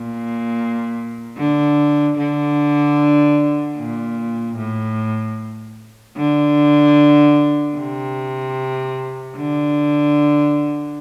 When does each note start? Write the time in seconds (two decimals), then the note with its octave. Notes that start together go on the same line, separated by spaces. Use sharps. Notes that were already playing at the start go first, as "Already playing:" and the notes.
Already playing: A#2
1.37 D3
2.17 D3
3.77 A#2
4.57 A2
6.17 D3
7.76 C3
9.36 D3